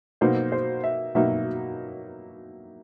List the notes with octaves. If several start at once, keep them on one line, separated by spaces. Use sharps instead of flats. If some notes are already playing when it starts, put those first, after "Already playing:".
B2 F#3 A#3 D#4 C5
C5
E5
B2 F#3 A#3 D#4 E5